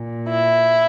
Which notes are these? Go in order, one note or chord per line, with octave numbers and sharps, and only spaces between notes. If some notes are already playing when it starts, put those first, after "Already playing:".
Already playing: A#2
E4